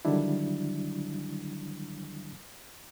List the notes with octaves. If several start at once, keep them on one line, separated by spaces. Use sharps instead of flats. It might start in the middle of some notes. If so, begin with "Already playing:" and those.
D3 D#3 F#3 G3 D4 E4